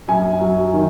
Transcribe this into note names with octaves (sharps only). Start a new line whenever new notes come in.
F#2 G#5
F#3
D#3